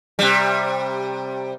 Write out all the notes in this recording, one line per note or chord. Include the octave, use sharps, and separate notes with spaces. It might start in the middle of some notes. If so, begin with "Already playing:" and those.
C3 G3